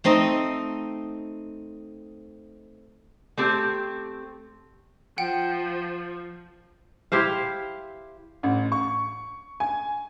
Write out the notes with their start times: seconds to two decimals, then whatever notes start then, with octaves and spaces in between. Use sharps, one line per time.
0.04 A3 C4 D#4 D#5
3.37 A3 C4 G4
5.18 F3 F#5 G5
7.12 E4 G4 C5 F5
8.43 A1
8.72 C#6
9.60 G#5